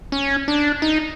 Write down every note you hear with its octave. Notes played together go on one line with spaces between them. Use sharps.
C#4
D4
D#4